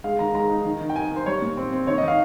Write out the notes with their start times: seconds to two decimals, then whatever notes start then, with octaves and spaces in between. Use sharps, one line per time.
0.04 G#3 F5
0.19 D#3 A#5
0.35 G#3 A#5
0.50 D#4
0.65 D#3
0.80 D#3
0.90 G5
0.96 D#3 G#5
1.11 D#3 C5
1.26 G3 C#5
1.42 A#2
1.57 C4
1.72 C4
1.87 D#3 C#5
1.98 D#5
2.03 D#3 F5